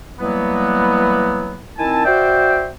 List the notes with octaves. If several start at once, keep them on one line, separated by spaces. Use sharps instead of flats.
E3 F#3 G3 A#3 B3
D#3 C4 E4 G#5 A5
F#4 C5 D5 E5 G5